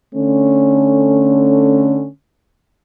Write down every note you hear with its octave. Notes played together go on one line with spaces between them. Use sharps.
D3 A3 C#4